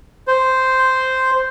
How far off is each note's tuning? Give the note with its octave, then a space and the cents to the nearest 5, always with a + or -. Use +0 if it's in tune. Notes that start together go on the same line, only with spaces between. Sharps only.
C5 -5